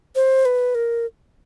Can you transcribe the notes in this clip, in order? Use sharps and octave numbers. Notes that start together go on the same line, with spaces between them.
C5
B4
A#4